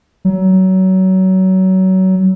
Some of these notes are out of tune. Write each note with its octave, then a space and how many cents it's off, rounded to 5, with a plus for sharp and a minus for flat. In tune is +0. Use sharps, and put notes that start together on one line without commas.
F#3 +25